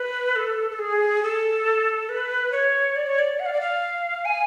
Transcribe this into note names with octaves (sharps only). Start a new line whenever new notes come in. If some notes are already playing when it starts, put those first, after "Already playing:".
Already playing: B4
A4
A4
G#4
A4
B4
C#5
D5
C#5
D5
F#5
F5
D5
F5
G#5